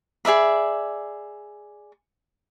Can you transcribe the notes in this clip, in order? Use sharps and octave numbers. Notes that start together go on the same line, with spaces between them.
G#4 D5 E5 B5